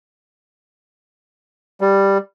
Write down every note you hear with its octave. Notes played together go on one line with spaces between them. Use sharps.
G3